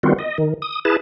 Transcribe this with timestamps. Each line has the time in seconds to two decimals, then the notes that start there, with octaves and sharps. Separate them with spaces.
0.03 D#3 G3 B3 C4 F4 F#4
0.19 D#5
0.38 D#3
0.62 D#6
0.85 E4 G#4 B4 A5